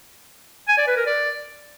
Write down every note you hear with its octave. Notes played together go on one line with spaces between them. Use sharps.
G#5
D5
B4
A#4
D5